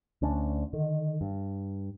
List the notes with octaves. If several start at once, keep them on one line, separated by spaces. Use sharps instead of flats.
D2 C#4 D4
D3 D#3
G2